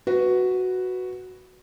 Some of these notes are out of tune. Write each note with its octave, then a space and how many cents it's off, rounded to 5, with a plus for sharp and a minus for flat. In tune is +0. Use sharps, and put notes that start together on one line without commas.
F#4 +0 B4 +0